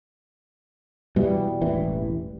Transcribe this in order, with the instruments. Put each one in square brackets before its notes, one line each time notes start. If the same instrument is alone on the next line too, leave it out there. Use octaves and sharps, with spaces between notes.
[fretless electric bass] B2 E3 [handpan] G3
[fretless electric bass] E1 A1 E3